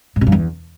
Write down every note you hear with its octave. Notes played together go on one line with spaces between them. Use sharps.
G#2
C3
G2
E2